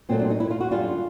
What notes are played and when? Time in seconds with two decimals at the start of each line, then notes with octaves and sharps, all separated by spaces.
0.09 A#2 F#3 A3 C4
0.19 D4
0.30 D#4
0.40 E4
0.51 F4
0.61 F#4
0.71 F#2 D3 G3 F4